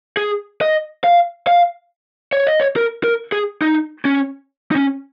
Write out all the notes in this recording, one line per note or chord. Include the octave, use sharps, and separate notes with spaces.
G#4
D#5
F5
F5
C#5
D#5
C#5
A#4
A#4
G#4
D#4
C#4
D#4
C#4